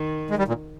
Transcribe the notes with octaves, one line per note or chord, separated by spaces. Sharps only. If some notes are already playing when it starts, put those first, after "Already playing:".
Already playing: D#3
G#3
G3
A#2